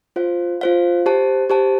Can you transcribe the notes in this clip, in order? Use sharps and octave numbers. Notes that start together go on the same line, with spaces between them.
F4 C5 F5
F4 C5 F5
G4 C5 A5
G4 C5 A5